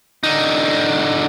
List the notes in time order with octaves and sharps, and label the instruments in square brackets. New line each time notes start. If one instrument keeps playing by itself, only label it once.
[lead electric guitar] D3 D#4